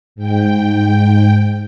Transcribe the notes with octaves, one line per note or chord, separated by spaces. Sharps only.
G#2 G5